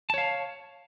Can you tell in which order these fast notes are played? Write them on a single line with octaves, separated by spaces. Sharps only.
A5 C#5 F5